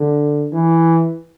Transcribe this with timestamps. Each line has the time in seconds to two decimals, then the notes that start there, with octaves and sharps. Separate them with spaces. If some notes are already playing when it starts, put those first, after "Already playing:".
Already playing: D3
0.52 E3